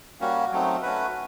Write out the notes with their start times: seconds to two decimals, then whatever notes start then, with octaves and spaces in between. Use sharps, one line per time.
0.20 G3 A#3 C#4 F#4
0.51 F#3 A3 C4 D#4
0.82 A3 C#4 F#4 B4